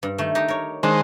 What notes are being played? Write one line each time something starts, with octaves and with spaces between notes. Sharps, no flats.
G2
D#3 A3
D#4 G4
A#4 C#5
D#3 G#3 D4 C5